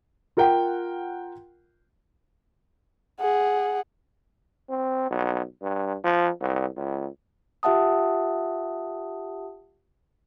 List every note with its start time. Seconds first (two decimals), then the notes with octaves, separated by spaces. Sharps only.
0.37 F4 A#4 F#5 G5
3.20 G#4 F#5
4.70 C4
5.10 B1
5.62 G2
6.04 F3
6.41 C2
6.77 C#2
7.63 F4 G4 E5 F#5 A5 D#6